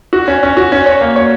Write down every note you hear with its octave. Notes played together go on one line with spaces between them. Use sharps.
F#4
C#4
C#4
F#4
C#4
C#5
A#3
C#5